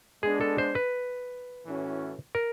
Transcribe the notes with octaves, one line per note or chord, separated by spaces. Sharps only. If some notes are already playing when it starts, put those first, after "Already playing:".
G#3 B3 D4 G#4
A4
C5
B4
A2 E3 A3 C#4 F#4
A#4